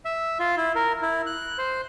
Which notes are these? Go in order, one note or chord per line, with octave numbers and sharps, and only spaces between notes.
E5
F4
E4
A#4
E4
F#6
C5